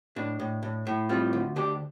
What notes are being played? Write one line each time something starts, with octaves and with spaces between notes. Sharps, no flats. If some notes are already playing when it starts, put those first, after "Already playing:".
A2 D4
A2
A2
A2
G3 C4 F4
D2
D2 D4 G4